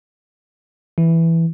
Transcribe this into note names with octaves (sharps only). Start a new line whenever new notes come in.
E3